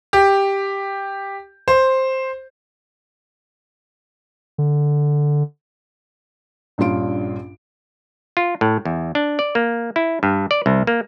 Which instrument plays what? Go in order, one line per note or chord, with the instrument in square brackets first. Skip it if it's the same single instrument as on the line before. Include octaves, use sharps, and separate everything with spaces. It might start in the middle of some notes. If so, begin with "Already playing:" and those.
[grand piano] G4
C5
[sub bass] D3
[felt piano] A#1 G2 C#4 F4 D7
[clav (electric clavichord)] F4
A2
E2
D4
D5
A#3
E4
G2
D5
C2
A#3